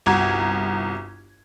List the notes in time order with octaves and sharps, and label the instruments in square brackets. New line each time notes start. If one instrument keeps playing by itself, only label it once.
[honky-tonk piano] G1 C2 F#4 A#5 G#6